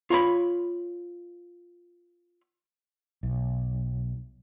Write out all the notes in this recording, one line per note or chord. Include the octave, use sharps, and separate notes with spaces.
F4 C#5 A#5 B5
B1